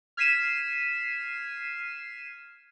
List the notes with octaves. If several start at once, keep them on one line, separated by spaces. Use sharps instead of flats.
F6 G#6 B6 C7 D#7 E7